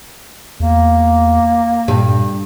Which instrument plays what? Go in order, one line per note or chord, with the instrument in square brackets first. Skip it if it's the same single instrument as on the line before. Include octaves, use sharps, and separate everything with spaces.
[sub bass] E2 [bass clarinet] A#3
[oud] G2 [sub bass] A#2